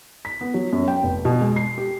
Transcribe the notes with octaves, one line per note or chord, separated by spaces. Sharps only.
B6
B3
F#3
F#2
G5
F1
B2
G#3
C7
G4